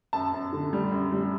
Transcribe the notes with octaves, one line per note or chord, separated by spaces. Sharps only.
F#2 A5
F#2
D3
G3
F#2
G3